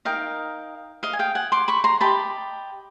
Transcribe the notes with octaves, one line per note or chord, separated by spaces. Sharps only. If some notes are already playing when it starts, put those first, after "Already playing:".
D#4 F#4 A#4 D#5 F5 G5
D#5 F5
G#5
F5 G5
F#5 G#5
C6 D6
B5 C#6
A#5 C6
G4 C5 D#5 A5 B5